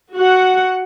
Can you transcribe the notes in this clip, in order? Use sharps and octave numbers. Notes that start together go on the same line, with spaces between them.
F#4 F#5